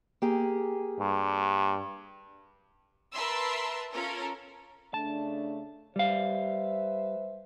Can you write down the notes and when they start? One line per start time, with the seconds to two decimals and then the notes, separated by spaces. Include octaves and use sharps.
0.22 A#3 G4 G#4
0.99 G2
3.14 A#4 B4 E5 A5 C6 E6
3.92 C#4 F4 A4 A#4
4.94 C#3 A3 D4 A5
5.96 G3 B4 C5 E5 F5